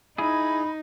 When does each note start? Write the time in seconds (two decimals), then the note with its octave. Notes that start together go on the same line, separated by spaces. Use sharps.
0.18 D#4 E4 G#4 B5